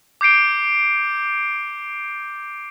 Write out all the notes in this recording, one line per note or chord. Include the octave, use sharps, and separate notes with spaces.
D6 G6 C7 D7 G7